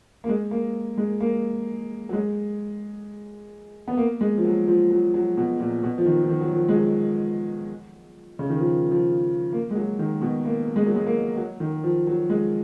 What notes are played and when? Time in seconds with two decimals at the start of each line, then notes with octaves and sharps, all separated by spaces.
0.24 A#3
0.29 G#3
0.51 A#3
0.97 G#3
1.21 A#3
2.09 F#3
2.13 G#3
3.88 B3
3.97 A#3
4.21 G#3
4.38 F3
4.44 F#3
4.68 F3
4.91 F#3
5.14 F#3
5.37 B2
5.60 A#2
5.83 B2
5.98 F3
6.06 D#3
6.23 F3
6.29 D#3
6.41 F#3
6.53 F3
6.68 G#3
6.75 F#3
8.39 C#3
8.50 D#3
8.60 F3
8.91 F3
9.53 A#3
9.71 G#3
9.75 F#3
9.99 D#3
10.21 B2
10.45 A#3
10.76 G#3
10.86 F#3
10.96 G#3
11.07 A#3
11.37 F#3
11.60 D#3
11.84 F3
12.07 F#3
12.30 G#3